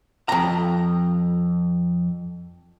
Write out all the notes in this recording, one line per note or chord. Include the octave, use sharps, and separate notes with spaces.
F2 A#5